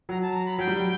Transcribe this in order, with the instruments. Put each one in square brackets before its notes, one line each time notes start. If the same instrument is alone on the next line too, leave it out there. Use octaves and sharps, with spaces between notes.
[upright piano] F#3 [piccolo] A#5
[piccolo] A5
A#5
B5
[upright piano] F#3 [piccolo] G5
[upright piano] G3
F#3